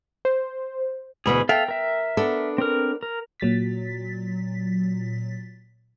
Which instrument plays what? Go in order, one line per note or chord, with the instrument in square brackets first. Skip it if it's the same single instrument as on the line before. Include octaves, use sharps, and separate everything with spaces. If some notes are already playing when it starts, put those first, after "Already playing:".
[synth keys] C5
[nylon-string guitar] D2 B2 E3 [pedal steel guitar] G#4 B5
[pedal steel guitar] A4 E5 F5 [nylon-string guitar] G5
[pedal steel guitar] A#4 E5
[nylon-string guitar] B3 D4 A4
[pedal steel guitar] C4 A#4
A#4
[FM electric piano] A#2 F#3 A6 B6